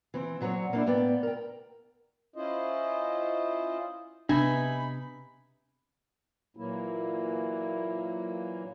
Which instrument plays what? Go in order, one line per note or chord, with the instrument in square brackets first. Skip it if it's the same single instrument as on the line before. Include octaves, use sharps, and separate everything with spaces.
[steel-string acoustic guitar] E3 C4
A#2 F#3 C4 F#4 C#5
A#3 D4 E4
A2 A#3 B3 D5 G5
A#4 G5
[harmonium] C#4 E4 F4 C5 D#5
[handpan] C3 B3 C4 [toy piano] D4 [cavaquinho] D#4 E5 G#5 [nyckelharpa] B5
[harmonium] A#2 E3 F#3 A#3 E4